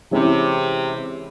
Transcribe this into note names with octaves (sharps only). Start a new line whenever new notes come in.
C3 E3 G#3 C#4 E4